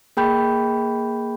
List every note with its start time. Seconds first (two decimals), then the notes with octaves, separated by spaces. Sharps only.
0.17 A#3 G#4 G5 B5 G6